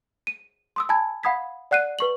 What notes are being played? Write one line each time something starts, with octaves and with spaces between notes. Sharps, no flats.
D#7
C6 D#6 E6
G#5 A5 B5 G#6
F5 F#5 B5 D#6 G#6 B6
D5 F#5 F#6 C7 D#7
B4 C#6 F#7